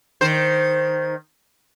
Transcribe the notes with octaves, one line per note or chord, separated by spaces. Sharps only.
D#3 C5